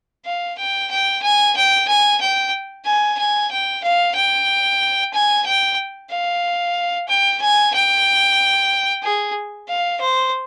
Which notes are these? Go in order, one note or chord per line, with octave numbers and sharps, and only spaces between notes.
F5
G5
G5
G#5
G5
G#5
G5
G#5
G#5
G5
F5
G5
G#5
G5
F5
G5
G#5
G5
G#4
F5
C5